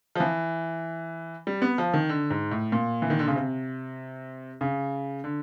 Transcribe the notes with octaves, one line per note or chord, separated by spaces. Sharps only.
F3
E3
G3
B3
F3
D#3
D3
G#2
A2
A#2
E3
D#3
D3
C#3
C3
C#3
D3